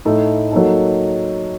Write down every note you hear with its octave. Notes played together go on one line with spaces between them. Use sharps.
A2 A3 D#4
F#3 A#3 D#4 A4